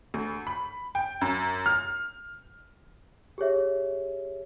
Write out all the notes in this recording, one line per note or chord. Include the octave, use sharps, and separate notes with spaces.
D2
B5
G5
F#2
F6
G4 G#4 C#5 E5